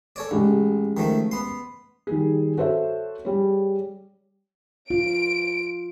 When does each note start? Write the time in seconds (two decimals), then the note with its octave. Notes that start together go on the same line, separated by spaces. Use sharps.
0.16 A4 C#5 D5
0.31 A1 C#3 G#3 G4
0.97 D#3 F3 A3
1.31 B3 C6
2.07 D#3 G3 G#4
2.58 F#4 A4 C5 C#5 E5
3.25 G3 G#4 C#5
4.90 F4 D7